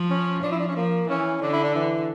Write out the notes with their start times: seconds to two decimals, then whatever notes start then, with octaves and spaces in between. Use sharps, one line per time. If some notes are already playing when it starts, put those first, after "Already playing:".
Already playing: F3
0.10 C#4
0.43 F3 D4
0.52 E4
0.60 D4
0.68 C#4
0.77 F3 A#3
1.08 E3 C#4
1.42 D3 D4
1.53 E4
1.64 D4
1.75 E3